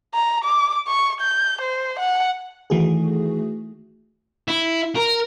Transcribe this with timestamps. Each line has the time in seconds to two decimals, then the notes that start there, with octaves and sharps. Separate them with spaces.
0.14 A#5
0.45 D6
0.87 C#6
1.21 G6
1.61 C5
1.99 F#5
2.70 D#3 E3 A3 F#4 G#4
4.48 E4
4.95 A#4